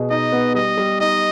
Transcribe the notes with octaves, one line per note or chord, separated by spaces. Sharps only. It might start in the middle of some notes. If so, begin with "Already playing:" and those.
Already playing: B2 G#4
D#4 D#5
B3
G3 D#5
G3
D#4 D#5